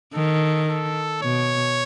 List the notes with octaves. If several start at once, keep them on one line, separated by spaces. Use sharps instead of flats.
D#3 A4
A4
B2 C#5